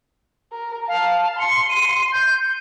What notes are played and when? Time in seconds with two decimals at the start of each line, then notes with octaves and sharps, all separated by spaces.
0.52 A#4
0.88 F5 A5
1.39 C6 C#7
1.69 D#7
2.12 G6